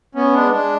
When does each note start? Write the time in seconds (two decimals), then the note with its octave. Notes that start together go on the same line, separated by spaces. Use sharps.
0.15 B3 C#4
0.33 G#3 D4
0.51 G#3 D4